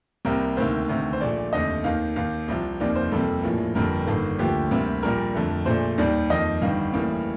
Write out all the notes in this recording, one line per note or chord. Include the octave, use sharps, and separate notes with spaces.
C2 C3 G3 A#3 A#4
D2 C3 D#3 A#3 C5
D2 C3 D#3
C5
A#1 A#2 A3 D5
F1 D#2 D3 A3 D#5
D#2 D#3 A#3 F5
D#2 D#3 A#3 F5
C2 C3 F3
F1 D#2 D#3 A#3 D5
C5
F2 C3 G3 A#3 A4
A#1 A2 F3 A#3
G1 F2 D3 G3 A#3 A#4
G1 G2 D#3 A#3 A4
D2 D3 F3 A#3 G4
D2 C3 G3 A#3
A#1 A#2 G3 A#4
F2 D3 A3
A#1 A#2 A3 C5
D#2 D#3 G3 D5
F2 D#3 A#3 D#5
G1 G2 D#3 G3 F5
A1 A2 G3 A#3